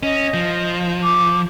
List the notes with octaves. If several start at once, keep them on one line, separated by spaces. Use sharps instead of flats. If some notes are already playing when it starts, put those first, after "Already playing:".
C#4 D#5
F3
D6